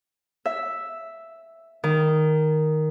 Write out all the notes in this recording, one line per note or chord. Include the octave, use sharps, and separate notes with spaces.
E5
D#3